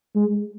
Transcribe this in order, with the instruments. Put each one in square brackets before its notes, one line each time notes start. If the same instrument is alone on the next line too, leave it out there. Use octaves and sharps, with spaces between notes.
[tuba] G#3